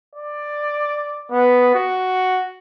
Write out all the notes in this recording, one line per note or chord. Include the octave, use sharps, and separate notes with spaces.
D5
B3
F#4